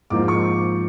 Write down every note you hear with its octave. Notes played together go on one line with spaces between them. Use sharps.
G#2 F3 A#3 D#4 D6
C#6